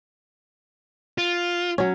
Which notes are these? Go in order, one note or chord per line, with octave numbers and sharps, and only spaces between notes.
F4
F#3 C#4